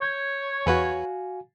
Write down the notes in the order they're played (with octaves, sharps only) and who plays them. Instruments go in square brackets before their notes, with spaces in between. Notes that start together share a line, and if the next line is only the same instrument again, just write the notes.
[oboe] C#5 [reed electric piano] G6 G#6
[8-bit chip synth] E2 B4 [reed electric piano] F#4 F5 G#5